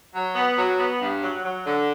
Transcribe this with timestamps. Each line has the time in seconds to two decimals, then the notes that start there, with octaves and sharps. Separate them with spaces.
0.14 F#3
0.35 B3
0.58 F#3
0.79 B3
1.00 G2
1.22 F#3
1.44 F#3
1.65 D3